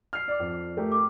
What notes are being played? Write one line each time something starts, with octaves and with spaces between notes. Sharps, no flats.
F6 C7
D5 D6
F2
A3 G4 A#4
D6